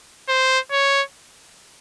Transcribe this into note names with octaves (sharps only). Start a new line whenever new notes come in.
C5
C#5